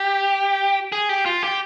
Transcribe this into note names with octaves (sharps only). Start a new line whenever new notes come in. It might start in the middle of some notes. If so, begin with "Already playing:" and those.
Already playing: G4
G#4
G4
F4
G4